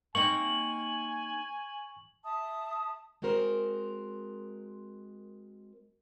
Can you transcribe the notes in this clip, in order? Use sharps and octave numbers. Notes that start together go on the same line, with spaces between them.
A#3 C4 D#4 G#5 C#6 F#7
E5 A5 D#6
G#3 C4 F#4 A#4 C5